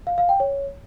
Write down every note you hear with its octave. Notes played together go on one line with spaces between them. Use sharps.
F5
F5
G5
C#5